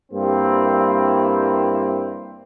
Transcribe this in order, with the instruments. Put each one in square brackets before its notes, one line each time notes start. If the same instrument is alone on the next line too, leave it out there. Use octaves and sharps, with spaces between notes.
[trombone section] G2 A#3 C4 E4